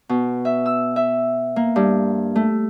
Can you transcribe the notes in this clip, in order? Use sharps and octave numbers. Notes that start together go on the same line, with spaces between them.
B2
E5
E6
E5
A#3
G2
A3